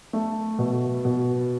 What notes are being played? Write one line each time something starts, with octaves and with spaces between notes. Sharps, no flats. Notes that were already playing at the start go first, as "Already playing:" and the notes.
A3
B2
B2